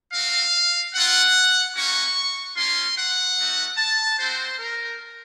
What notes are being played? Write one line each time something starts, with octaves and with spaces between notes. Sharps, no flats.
C4 F#4 F5
C4 F4 F#5
A#3 C#4 F#4 C#6
A#3 C#4 F4 C6
F#5
A3 D#4 F#4
A5
C4 F#4 C5
A#4